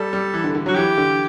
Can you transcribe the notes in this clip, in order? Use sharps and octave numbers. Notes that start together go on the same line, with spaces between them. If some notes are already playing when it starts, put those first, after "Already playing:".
Already playing: G3 A4
G3
E3
D3
D3
F#3 F#4
E3 G4
D3